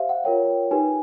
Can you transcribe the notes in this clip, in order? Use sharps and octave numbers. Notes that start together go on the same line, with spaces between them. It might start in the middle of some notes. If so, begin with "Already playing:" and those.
Already playing: G4 C5 E5 F5
F#5
F4 A#4 C#5 G5
D#4 G4 B4 G#5